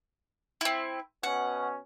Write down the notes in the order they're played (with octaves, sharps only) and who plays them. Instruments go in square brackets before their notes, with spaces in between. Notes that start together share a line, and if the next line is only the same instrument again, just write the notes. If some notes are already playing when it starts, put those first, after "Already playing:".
[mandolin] C4 E4
[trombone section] B2 C#4 [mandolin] F#5